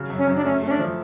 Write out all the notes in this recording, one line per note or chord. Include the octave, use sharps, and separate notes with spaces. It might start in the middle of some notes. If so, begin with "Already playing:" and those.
Already playing: C#3 F#3
F#2
C#4
F#2
D4
A3 C#4
A3 C#4
D4
F3